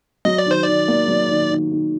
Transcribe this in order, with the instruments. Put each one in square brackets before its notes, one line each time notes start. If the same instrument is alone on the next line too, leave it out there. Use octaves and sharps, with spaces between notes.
[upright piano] F#3 [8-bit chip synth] D#5
[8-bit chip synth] D5
[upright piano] D#3 [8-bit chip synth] C5
[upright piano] D#3 [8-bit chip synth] D5
[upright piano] A#3
F#3
D#3
D#3
D#3